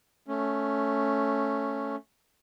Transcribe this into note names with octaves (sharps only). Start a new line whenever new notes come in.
A3 C#4